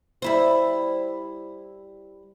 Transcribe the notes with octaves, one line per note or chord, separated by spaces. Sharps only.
G3 E4 C5